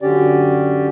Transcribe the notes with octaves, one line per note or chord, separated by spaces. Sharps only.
F#2 D3 C#4 G4 D5